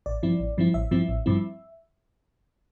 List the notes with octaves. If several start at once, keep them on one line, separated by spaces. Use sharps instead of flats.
A1 D5
G2 F3 C4 E4
A1
G2 F3 C4 E4
A1 E5
G2 F3 C4 E4
A1
G2 F3 C4 E4